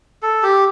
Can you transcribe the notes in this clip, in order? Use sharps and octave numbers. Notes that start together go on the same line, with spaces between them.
A4
G4